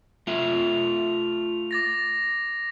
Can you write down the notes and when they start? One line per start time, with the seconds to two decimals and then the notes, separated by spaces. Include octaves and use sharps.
0.27 A3 F4 E5 F7
1.71 D6 A6 A#6